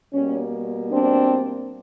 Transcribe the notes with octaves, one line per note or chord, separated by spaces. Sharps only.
B2 G3 A#3 C#4
C4 D4